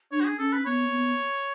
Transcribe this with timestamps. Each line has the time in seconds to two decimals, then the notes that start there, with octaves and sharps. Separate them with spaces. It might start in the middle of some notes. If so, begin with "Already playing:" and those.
0.11 D4 C#5
0.21 F#4
0.25 G#4
0.39 C#4 A4
0.52 B4
0.66 B3 C#5
0.92 B3